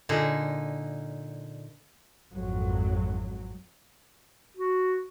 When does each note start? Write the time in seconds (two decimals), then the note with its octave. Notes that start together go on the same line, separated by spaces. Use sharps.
0.09 A#2 D3 D#4 G#4
2.31 G#1 F2 F#3
4.57 F#4